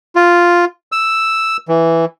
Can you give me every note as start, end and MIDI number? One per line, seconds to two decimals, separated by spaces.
0.16 0.65 65
0.92 1.57 88
1.68 2.05 52